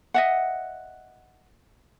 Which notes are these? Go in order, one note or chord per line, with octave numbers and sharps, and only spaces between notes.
D#5 E5 F#5